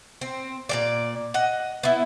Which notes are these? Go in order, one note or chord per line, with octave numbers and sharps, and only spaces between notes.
C4
A#2 G#3 D5
D#5 F#5
B3 E4